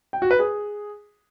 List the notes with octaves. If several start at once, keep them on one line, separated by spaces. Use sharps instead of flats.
G5
F#4
B4
G#4